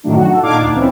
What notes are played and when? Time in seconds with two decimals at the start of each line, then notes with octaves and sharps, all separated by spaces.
0.04 F#2 A2 D#3 F#3 A3 D4
0.16 F#4
0.28 A4
0.42 A#2 D4 D#4 F5 D6 G#6
0.58 D2 D4
0.75 E3 C4 C#4 E4